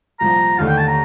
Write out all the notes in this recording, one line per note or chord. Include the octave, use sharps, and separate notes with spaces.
C2 A#2 F3 A#5
D#2 D3 A3 D#4 F5
G5
A5
A#5